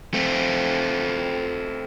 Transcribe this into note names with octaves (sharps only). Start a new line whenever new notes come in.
A3 C4